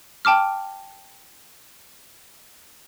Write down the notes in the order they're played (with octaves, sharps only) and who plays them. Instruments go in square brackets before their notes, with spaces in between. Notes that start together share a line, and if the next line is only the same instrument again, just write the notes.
[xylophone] G5 A5 D6 F6